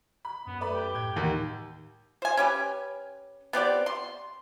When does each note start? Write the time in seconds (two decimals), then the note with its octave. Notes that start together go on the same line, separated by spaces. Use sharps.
0.25 B5
0.47 F#2 B3
0.61 A3 B4 D5 B5
0.74 G4
0.95 A2 G6 G#6
1.16 D#2 F#5
2.22 C5 G#5
2.37 C#4 G4 B4
3.53 B3 C4 G4 D5
3.86 C6